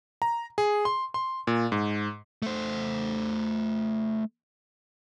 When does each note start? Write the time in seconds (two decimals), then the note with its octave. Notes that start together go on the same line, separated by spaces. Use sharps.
0.22 A#5
0.58 G#4
0.85 C6
1.14 C6
1.47 A#2
1.72 G#2
2.42 A3 C5